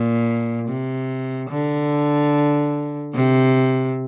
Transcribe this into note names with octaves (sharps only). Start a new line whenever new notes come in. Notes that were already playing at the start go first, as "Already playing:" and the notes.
Already playing: A#2
C3
D3
C3